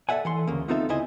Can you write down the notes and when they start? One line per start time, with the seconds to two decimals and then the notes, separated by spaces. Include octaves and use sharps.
0.09 A4 D5 E5 F#5 G#5
0.25 E3 A4 C6
0.47 D2 C#3 A#3
0.68 B3 C4 D#4 F4 A4 E5
0.89 D2 C#3 E4 C5 D#5 G#5